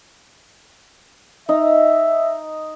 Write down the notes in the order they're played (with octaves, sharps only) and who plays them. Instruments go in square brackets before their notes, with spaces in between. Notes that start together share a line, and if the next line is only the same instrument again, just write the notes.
[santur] D#4 [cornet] E5